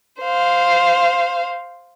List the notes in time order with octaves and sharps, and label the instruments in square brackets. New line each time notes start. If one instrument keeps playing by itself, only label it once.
[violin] C5 F5